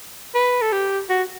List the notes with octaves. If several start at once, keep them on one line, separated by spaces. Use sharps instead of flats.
B4
A4
G4
F#4